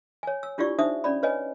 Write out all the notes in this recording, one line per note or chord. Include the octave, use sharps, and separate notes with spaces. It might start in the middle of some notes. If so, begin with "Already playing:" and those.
C#5 G#5
E6
D4 E4 F4 G4 D5 C#6
D4 D#4 C5 E5 D#6
C#4 D5 B5
B4 C#5 D#5 G#5